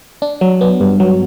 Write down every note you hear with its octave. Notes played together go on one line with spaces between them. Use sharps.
D4
F#3
B3
G2
F#3